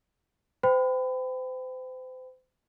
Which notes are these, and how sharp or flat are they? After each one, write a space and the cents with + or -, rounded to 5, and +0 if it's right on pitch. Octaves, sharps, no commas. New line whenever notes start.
C5 -35 G5 +0 B5 +30